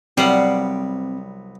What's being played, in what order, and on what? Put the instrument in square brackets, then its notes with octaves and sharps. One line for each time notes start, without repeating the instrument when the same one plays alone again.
[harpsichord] C2 F#3 B3 [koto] G3 [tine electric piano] C4 [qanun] D5 F5 F#5